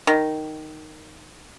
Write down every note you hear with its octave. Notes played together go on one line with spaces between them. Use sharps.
D#3